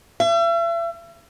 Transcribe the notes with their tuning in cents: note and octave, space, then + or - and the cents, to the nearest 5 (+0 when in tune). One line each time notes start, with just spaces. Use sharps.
E5 +40